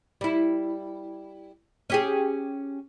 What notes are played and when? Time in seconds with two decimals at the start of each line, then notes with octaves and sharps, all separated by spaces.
0.21 G3 E4
1.90 C#4 G4 G#4